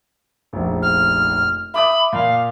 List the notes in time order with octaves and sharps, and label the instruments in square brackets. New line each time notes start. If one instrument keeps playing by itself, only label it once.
[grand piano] F1 A#1
[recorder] F6
[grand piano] E5 D6 D#6 [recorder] B5
[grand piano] A#2 [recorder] F5